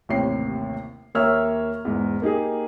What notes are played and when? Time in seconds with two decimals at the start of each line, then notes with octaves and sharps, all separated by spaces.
0.09 A1 D#2 C3 C#5 C7
1.15 D#2 A#3 C#5 E5 E6 F6
1.85 E2 G#2
2.22 A#3 D#4 G4 G#4